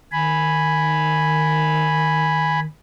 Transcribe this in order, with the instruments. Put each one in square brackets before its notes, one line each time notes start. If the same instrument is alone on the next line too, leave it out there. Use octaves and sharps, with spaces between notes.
[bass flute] D#3 [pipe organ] G#5 B5